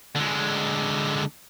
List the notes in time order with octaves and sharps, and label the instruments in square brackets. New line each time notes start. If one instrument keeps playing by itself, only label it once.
[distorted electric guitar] D3 G#3